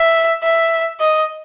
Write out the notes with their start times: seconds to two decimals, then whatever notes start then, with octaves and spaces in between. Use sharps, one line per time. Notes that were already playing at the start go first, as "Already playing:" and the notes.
Already playing: E5
0.43 E5
1.00 D#5